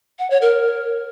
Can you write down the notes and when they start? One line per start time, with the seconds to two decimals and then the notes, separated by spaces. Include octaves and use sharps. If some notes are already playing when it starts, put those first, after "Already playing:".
0.19 F#5
0.30 C#5
0.42 A#4